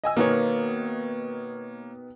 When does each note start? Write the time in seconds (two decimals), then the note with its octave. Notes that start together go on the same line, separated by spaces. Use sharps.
0.04 D#5 G#5 E6
0.17 B2 D#3 A#3 B3 C#5